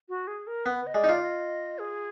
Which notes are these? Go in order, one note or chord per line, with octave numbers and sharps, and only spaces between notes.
F#4
G#4
A#4
B3 B4
D#5
G#3 D5
D#4
F4
D#5
G#4